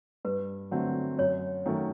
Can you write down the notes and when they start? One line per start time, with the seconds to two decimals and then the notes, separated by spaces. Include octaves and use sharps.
0.25 G2 B4
0.71 D3 F#3 A3 C4
1.18 F#2 C#5
1.66 D#3 F#3 A3 C#4